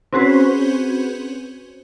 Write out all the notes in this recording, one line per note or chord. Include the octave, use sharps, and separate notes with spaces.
C4 C#4 F#4 G#4 B4 C5